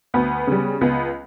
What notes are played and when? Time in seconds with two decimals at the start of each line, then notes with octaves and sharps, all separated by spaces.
0.14 D2 B3
0.47 C#3 G3
0.81 C#2 B3